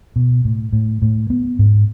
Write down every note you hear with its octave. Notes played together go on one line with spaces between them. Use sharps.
B2
A2
A2
A2
B3
G#2